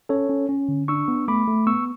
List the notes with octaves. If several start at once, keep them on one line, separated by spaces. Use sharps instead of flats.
C#4 A4 C#5
C#4
C#4
D3
D4 C#6 E6
B3
A3 B5 D6
A3
B3 C#6 E6